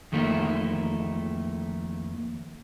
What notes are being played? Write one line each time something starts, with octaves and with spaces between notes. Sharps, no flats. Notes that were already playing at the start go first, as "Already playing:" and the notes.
F2 D#3 A3 A#3 E4